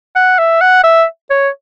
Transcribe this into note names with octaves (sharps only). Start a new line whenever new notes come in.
F#5
E5
F#5
E5
C#5